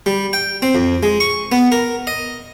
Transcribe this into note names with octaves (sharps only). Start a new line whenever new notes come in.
G3
G5
C4
F2
G#3
C#6
B3
A#4
D#5